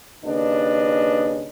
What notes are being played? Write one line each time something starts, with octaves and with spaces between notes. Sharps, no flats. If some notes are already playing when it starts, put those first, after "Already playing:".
D#2 C#3 D4 B4 D#5